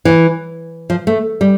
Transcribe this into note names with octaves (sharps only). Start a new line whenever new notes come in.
E3
F3
A3
G3